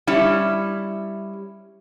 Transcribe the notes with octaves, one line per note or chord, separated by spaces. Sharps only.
G3 C#4 E4